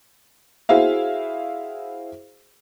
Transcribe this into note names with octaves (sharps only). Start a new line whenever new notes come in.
E4 F#4 G#4 C5 E5 F5